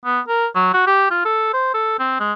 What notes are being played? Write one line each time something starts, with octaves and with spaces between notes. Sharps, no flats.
B3
A#4
F#3
F#4
G4
F4
A4
C5
A4
C4
G#3